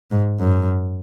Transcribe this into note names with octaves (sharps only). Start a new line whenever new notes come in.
G#2
F#2